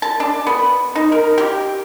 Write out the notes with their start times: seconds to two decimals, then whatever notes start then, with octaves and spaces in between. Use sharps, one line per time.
0.02 A5
0.20 D4
0.47 B3
0.96 D#4
1.12 A#4
1.38 G4